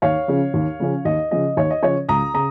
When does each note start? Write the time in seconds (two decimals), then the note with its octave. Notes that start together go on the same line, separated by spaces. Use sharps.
0.02 D#2 C#5 F5
0.28 C#3 F3 C#4
0.54 D#2
0.80 C#3 F3 C#4
1.05 D#2 D#5
1.31 C#3 F3 C#4 D#5
1.57 D#2 C#5
1.71 D#5
1.83 C#3 F3 C#4 C#5
2.09 C#2 A#5 D#6
2.34 C#3 A#5 D#6